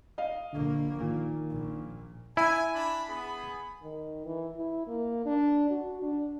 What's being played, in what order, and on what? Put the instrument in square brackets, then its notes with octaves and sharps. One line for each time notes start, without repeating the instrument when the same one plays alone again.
[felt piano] D#5 F5
[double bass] A#1 A#3 [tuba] D3
[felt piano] A#2 [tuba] D#3
[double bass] A#1
[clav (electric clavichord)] E4 [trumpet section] G#5
[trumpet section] D4 B5
B3 G#4 B5
[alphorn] D#3
E3
E4
A#3
D4
F#4
D4